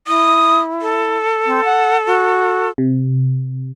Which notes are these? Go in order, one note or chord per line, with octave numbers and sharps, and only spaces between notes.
E4 D#6
A4
C4
F#5
F#4
C3